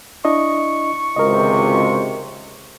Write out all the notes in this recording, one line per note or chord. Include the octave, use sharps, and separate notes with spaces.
D4 E4 D#5 C#6
G#1 C#2 C3 A#4 D#5